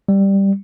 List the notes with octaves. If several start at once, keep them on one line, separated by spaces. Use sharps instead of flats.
G3